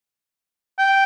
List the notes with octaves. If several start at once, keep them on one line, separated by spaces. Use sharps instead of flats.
G5